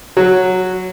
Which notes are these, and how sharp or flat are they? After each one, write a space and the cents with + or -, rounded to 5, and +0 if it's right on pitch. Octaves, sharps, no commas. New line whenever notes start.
F#3 -5